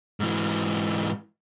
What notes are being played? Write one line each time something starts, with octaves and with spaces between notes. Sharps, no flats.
G#2 E3